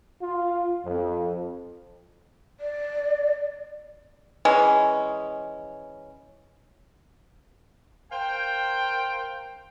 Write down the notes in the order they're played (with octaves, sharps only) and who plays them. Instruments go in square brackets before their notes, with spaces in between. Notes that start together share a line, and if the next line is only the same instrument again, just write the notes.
[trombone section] F4
F2
[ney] D5
[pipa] E3 G#3 C#4
[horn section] A#4 C5 F5 G5